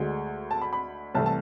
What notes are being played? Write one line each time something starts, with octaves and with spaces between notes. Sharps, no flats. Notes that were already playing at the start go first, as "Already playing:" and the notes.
Already playing: D2 D3 G#3
A5
B5
B5
C2 C3 E3 A3 A5
A5